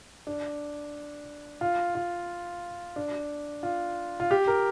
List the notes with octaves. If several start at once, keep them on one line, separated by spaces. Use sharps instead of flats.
D4
F4
F4
D4
F4
F4
G4
A#4